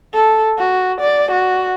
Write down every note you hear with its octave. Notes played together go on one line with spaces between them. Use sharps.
A4
F#4
D5
F#4